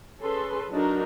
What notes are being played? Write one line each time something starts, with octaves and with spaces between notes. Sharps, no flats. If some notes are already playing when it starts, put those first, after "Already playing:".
C#4 G#4 A4 B4 C6
F#3 D4 D#4 F#4 A#4